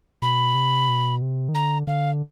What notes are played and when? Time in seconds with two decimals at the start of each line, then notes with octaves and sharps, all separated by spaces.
0.22 B2 B5
0.55 C3
0.89 B2
1.22 C3
1.49 D#3
1.54 D3 A#5
1.87 D3 F5